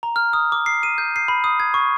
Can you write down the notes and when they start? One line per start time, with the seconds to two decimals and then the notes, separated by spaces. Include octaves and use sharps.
0.03 A#5
0.16 F6
0.33 D#6
0.52 D6
0.66 C7
0.83 D#7
0.98 G6
1.16 C7
1.28 B5
1.44 D#6
1.60 G#6
1.74 C#6